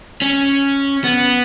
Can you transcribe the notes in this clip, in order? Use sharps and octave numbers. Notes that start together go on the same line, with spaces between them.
C#4
B3